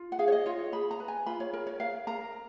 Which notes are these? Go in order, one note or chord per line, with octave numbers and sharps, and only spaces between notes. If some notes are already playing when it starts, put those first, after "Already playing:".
Already playing: F4
F#5
G#4 F5
C#5
D#5
F4 C#5
G#4 B5
A#5
B4
G#5
F4 B5
C#5
A#4
C#5
A#4 F5
A#4 A#5